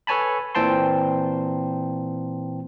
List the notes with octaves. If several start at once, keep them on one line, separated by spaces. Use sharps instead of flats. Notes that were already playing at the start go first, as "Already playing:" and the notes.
A4 B4 C#5 G#5 A5 B5
A#2 E3 C4 G5 A5 C6